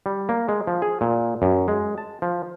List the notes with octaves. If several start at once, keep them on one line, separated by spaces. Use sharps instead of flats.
G3
A#3
G#3
F3
G#4
A#2
F#2
G#3
A5
F3